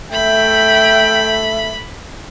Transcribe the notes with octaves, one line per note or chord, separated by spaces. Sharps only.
A3 E5 G5 B5